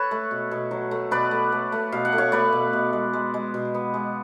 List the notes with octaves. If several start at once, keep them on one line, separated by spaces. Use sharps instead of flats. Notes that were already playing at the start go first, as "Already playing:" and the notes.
Already playing: A4 B4 C#5
A3
B2
B2
F#3
A3
B2 B4 D5
A3
A3
A3
B2 F5
F#5
A3
C#5 F5
A3 B4 D5
B2
B2
G#3
G#3
G#3
B2
B3
G#3